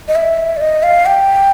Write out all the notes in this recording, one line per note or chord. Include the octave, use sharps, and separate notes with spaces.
D#5
E5
D5
D#5
F5
G5